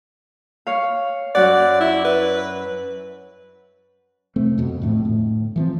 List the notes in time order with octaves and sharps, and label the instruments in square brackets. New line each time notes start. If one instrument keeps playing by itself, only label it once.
[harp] C#5 F5
[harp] F#2 F#5 [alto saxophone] D5
[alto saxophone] E4
B4
[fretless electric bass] F1 A3 C4
F2 B2
F2 A2 D3
A2
E3 F3 C4